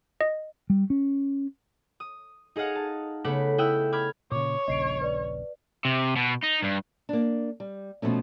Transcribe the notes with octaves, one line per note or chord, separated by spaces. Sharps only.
D#5
G3
C#4
D#6
D#4 G#4 D#5 F5 F#5
A5
C#3 A3 B3 F#5 D6 B6
E4 G5 D#6 E6 F#6 E7
B5 D6 F6 G#6
A#2 C#3 C#5 D6
D#1 A#1 C#3 D#5 C7 D7
B4 D5
C3
B2
D#4
G2
A#3 D4
G3
B2 F3 A3 C#4